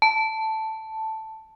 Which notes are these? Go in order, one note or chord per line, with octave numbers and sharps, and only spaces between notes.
A5